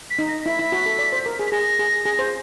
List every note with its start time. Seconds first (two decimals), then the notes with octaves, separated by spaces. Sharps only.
0.10 B6
0.19 D#4
0.28 A#6
0.46 E4 B6
0.59 E4
0.72 F#4
0.86 A4
0.99 D5
1.12 C5
1.26 A#4
1.39 G#4
1.47 B6
1.52 G#4 A#6
1.79 G#4
2.05 G#4
2.19 C5